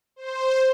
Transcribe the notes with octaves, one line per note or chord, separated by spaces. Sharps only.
C5